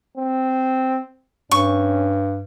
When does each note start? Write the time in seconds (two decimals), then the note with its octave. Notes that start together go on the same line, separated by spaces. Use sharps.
0.18 C4
1.51 G2 C#4 C#6